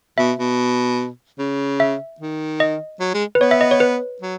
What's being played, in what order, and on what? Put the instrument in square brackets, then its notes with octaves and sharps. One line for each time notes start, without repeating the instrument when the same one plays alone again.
[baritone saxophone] B2 [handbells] E5
[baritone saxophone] B2
C#3
[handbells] E5
[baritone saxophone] D#3
[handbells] D#5
[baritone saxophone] F#3
G#3
[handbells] B4
[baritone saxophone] B3 [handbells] C#5
[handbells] E5
D#5
C#5
B4
[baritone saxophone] F#3